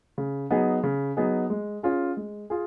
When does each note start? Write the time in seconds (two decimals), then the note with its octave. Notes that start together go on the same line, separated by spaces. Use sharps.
0.18 C#3
0.51 F#3 B3 D#4 G#4
0.83 C#3
1.17 F#3 B3 D#4 G#4
1.50 G#3
1.83 C#4 F4 G#4
2.17 G#3
2.50 F4 G#4